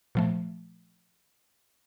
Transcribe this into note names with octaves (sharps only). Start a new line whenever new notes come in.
A#2 F3 A3